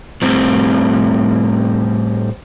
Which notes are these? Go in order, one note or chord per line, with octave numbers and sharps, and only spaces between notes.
A2 G3 C4